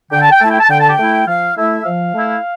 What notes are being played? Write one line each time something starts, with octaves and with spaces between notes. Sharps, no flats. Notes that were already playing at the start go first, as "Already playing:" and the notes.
D3 G5
A5
G5
A3 E4 A5
G5
A5
D3 G5
A5
G5
A3 E4
F3 F5
A3 E4 E5
F3 F5
A3 E4